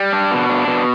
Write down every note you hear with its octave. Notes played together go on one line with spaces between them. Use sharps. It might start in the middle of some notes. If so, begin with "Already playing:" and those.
Already playing: G3
D4
B2
D4
B2